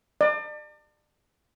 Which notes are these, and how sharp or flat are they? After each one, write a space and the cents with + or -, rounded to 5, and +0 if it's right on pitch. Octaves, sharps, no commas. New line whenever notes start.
D5 +35